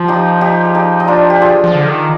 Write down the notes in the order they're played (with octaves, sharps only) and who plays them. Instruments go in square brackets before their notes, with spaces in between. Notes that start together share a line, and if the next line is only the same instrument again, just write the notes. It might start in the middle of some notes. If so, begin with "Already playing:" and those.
Already playing: [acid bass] F3 [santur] F4
[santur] D#4 G4
D#4 G4
G#4
D#4 G4
D#4
D4 F4
G4
F4 G#4
[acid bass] F3
D3
D#3